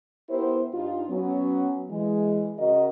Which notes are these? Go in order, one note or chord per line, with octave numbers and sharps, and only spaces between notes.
B3 E4 G4 A#4 C5
G2 D#4 F4
F#3 B3 C#4
E3 G#3
C#3 F#4 A#4 D#5